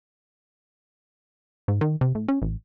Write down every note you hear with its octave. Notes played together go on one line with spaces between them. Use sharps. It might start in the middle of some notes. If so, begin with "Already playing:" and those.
G#2
D#3
C3
A2
C#4
A1